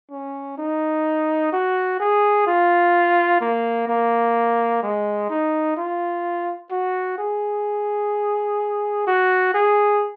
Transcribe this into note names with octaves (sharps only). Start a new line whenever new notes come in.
C#4
D#4
F#4
G#4
F4
A#3
A#3
G#3
D#4
F4
F#4
G#4
F#4
G#4